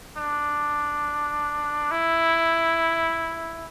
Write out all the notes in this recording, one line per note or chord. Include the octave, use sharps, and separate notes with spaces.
D4
E4